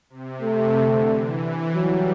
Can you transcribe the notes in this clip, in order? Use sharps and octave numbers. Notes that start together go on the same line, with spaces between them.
C3
A3
D3
E3
F#3 G3